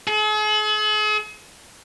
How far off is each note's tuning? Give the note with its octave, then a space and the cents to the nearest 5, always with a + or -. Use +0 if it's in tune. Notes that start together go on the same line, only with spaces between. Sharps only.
G#4 +45